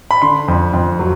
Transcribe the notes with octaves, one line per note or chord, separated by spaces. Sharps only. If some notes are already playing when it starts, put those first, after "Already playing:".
B5
D3 C6
F2
F2
F#3